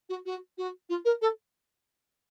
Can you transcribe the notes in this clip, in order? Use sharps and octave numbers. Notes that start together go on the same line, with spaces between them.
F#4
F#4
F#4
F4
A#4
A4